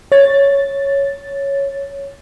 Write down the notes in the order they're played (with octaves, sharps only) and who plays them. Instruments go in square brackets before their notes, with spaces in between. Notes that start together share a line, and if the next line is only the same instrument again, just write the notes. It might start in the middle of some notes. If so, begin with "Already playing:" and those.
[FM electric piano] C#5 A6